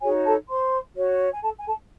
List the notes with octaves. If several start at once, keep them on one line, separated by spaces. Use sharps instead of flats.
D#4 F#4 G#4 C#5 G#5
A4 A5
C5 C6
F#4 C#5
G#5
A4 A5
G#5
A4 A5